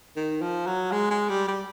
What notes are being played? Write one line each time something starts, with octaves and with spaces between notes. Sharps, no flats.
D#3
F3
F#3
G#3
G#3
G3
G3